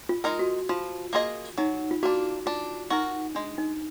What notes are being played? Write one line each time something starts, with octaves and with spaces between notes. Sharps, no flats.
F4
G#3 D#4 A#4
F#4
F3 F4
A#3 F4 G#4 D#5
F#3 D#4
F4
A#3 D4 F#4
D4 F4
D#4 F#4 A#4
G#3 D4
D#4